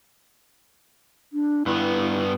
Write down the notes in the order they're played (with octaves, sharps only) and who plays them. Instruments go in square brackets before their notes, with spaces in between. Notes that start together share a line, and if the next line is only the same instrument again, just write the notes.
[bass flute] D4
[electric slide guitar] G2 B3 [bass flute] E4